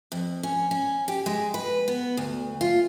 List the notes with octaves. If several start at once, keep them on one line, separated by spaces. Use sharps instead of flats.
F2
C#4
C#4
G4
G#3
B4
B3
D2
F4